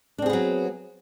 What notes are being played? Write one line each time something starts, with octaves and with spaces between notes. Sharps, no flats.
F#3 B3 C4 D4 G#4